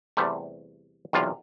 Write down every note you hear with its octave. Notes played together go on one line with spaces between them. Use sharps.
E2 C3 G3 A3
B1 E2 C3 F4